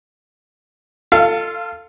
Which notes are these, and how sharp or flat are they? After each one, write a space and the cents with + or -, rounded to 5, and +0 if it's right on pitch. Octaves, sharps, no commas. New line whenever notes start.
F4 +0 A4 +20 F5 -20